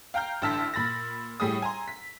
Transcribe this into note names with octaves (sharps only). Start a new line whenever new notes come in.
F5 G5 A#5 F6 G6
A1 D3 A5 E6 F6 B6
A#2 B5 A6 A#6
A2 G3 G#4 D#6
G#5 A#5 C6
B6